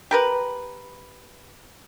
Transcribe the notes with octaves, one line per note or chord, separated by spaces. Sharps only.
G4 A#4 B4